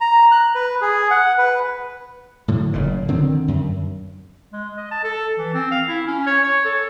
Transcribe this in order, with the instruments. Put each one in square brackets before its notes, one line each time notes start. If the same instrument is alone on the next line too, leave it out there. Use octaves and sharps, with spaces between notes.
[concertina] A#5
F#6
B4
G#4
F#5
B4
[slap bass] A2 D3 F#3
F#1 A#2
D3 D#3 C4
F#2
[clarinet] G#3
D#5
A5
A4
E3
C4
F5
E4
C#4
C#5
C#5
A4